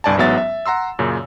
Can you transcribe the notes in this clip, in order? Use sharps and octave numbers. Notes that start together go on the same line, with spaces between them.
G1 C2 G2 D5 G#5 A5
A1 G#2 F#3 B3 E5 A6
E5
F#5 A#5 C6 E6
F#2 A#2 C#3